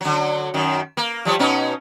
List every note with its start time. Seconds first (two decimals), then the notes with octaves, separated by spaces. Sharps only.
0.01 D3 F#3
0.54 F#2 D#3
0.97 A#3
1.25 F3 G3 C#5
1.39 B2 C#4 D#4